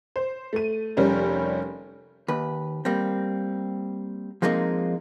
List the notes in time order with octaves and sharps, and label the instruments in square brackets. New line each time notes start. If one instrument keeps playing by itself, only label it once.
[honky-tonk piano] C5
A3 D#7
F1 G3 C#4 A#4
[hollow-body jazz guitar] D#2 B4
G3 A#3 C4
F3 G#3 A#3 C4 D#4